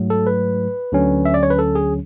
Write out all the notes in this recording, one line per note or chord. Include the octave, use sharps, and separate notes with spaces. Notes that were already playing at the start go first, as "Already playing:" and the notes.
Already playing: G#2 F#3 A3
A4
B4
D2 D3 F#3 C#4
E5
D5
C#5
B4
A4
G#4